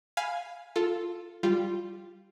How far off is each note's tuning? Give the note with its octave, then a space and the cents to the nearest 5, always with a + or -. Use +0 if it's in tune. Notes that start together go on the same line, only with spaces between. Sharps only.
F5 +0 G#5 +0 B5 +0
F4 +0 A4 +0
G3 +0 F4 +0